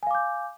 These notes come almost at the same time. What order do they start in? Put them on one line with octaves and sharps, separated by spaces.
G#5 F5 D6 G6